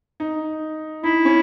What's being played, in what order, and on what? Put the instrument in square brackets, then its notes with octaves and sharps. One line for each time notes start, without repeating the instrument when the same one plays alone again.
[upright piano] D#4
[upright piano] D#4 [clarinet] E4
[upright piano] C#4